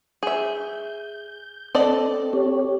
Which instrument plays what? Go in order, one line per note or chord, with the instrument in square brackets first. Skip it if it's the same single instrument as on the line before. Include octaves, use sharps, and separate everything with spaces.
[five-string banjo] G#4 E5 [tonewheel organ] G6
[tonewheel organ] C4 [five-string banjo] A4 D5 D#5
[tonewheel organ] G4 C#5